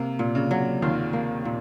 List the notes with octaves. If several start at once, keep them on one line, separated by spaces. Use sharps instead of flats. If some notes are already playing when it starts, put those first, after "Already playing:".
Already playing: C3 A#3
A#2
C#3
F#3
D#2 D#3 F4
A#3
A#2